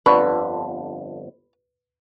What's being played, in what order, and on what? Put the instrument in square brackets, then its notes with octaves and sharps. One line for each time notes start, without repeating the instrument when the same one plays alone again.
[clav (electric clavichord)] G1 F2 D3 [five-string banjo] B4 [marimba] D5 B5 C#6